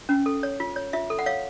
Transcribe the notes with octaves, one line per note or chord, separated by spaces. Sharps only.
C#4
A4
C#5
F4
C#5
F4 E5
A4
F#5
C#5 F5